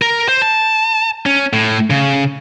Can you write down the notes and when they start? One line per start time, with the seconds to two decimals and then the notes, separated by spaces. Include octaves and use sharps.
0.02 A#4
0.28 C5
0.42 A5
1.26 C#4
1.53 A2
1.90 C#3